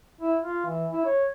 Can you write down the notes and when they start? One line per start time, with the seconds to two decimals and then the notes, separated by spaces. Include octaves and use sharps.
0.21 E4
0.43 F4
0.66 E3
0.92 E4
1.05 C#5